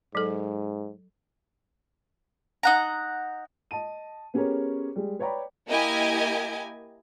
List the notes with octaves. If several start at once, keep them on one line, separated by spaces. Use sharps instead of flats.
G#2 F#3 A4
D#4 F#5 A#5
D#5 A5 D#7
B3 C#4 G4 G#4 A#4 C#5
G3 G#3
B4 C#5 D5 G5 A#5 B5
A#3 E4 G4 D#5 G#5